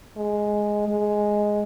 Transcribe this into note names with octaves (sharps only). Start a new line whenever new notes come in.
G#3
G#3